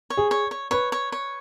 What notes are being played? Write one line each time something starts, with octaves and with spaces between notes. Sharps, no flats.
C#5
G#4
C#5
C#5
B4 C#5
C#5
C#5